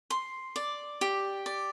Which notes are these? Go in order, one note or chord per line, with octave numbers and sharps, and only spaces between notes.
C6
D5
G4
D5